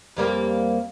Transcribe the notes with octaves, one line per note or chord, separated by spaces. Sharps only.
F2 G3 A#3